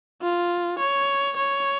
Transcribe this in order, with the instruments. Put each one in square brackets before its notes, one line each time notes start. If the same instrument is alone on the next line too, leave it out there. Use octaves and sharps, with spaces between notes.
[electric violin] F4
C#5
C#5